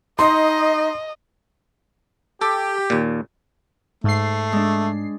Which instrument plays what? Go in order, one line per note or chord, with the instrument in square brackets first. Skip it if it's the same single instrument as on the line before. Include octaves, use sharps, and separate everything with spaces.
[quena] D#4 [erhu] D#5 [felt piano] C6
[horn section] G4 [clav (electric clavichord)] A4
[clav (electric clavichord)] D#2 A#2
[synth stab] G#2 C7 [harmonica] A3
[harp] G#3 D4